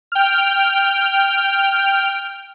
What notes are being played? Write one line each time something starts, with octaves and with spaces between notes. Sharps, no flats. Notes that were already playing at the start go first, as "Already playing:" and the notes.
G5 F6